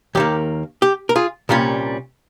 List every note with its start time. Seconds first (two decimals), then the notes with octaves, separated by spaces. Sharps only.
0.15 D#2 D#3 A#3 G4
0.82 G4
1.09 A#4
1.16 F4 G#4
1.49 C2 A#2 G3 C#4 F4